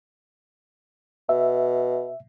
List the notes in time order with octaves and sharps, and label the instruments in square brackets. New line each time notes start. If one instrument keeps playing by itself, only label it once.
[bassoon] B2 [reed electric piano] E5